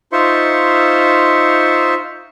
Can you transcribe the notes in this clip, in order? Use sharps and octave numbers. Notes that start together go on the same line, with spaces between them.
D#4 F4 C5 E5 C6 C#6